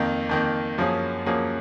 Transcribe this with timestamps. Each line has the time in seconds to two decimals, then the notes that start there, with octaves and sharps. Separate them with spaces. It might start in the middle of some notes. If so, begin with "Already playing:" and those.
Already playing: F2 D#3 A#3
0.29 F2 D#3 A#3
0.78 F#2 F3 A#3 C#4 G#4
1.26 F#2 F3 A#3 C#4 G#4